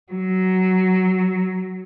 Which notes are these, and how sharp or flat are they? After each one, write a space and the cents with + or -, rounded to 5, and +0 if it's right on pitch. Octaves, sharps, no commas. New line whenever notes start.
F#3 +10